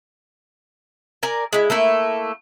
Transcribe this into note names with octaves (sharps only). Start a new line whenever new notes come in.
A#4 D5 G#5
G#3 E4
A3 A#3 E4